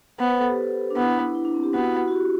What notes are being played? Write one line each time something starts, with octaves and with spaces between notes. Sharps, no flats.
B3 C5
B4
A4
G4
D4
B3 E4
E4
D4
C4
G4
B3 F#4
E4
F#4
F#4
G4